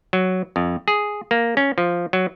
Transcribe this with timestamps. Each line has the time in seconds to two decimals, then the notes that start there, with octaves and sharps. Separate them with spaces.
0.13 F#3
0.56 F2
0.88 G#4
1.31 A#3
1.57 C#4
1.78 F3
2.13 F#3